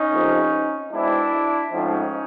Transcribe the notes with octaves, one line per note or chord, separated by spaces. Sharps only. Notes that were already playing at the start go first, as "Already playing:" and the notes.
Already playing: C#4 D#4
F2 C3 F3 A#3
B2 G#3 C4 D4 E4
G#2 F3 A3 C4 C#4 D#4